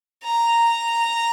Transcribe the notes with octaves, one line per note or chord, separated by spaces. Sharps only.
A#5